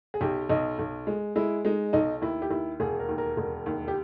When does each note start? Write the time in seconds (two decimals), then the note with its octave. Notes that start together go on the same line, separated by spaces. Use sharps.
0.14 G#4
0.21 B1 G4
0.49 B1 D#5
0.79 B1
1.07 G#3
1.36 G#3 E4
1.65 G#3 D#4
1.93 B1 D#4
2.22 D#2 E4
2.42 G4
2.50 D#2 E4
2.80 E1 G#4
2.99 A#4
3.09 D#2
3.18 A#4
3.37 E1
3.66 D#2
3.88 G4